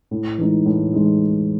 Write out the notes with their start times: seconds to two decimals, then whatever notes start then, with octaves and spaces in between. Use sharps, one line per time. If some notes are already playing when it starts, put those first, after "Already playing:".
0.11 A2
0.38 E3 G#3 D#4
0.66 A2
0.93 E3 G#3 D#4